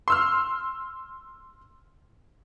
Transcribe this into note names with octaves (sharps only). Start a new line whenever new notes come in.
C6 E6 F6